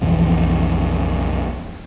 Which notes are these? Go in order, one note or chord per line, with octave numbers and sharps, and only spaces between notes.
B1 F2 E3